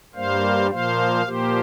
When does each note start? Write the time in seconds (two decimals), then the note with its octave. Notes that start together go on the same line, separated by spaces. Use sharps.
0.15 G2 G3 A#3 C5 F5
0.71 A#2 F3 A#3 C5 F5
1.25 A#2 F3 A#3 G4 C5